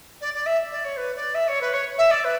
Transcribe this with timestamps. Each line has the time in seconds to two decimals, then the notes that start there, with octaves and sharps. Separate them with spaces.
0.20 D5
0.33 D5
0.46 E5
0.71 D5
0.84 C#5
0.96 B4
1.15 D5
1.34 E5
1.47 C#5
1.61 B4
1.73 C#5
1.98 E5
2.10 D5
2.24 B4